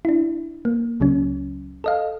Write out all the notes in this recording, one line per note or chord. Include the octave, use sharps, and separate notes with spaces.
D4 E4
A#3
C#2 C#3 F#3 C#4
A4 D#5 F5